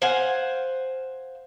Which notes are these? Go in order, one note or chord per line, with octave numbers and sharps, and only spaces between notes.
C5 F5 F#5 G#5